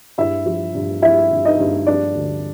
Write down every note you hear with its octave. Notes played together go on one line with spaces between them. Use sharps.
G2 E4 E5
F3
G2
F3 E4 E5
G2
D#4 D#5
G2
F3 D4 D5
D2